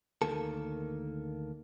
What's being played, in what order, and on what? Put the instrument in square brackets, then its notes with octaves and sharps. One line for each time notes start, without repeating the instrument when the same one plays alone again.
[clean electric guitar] D2 D#3 A#3 A4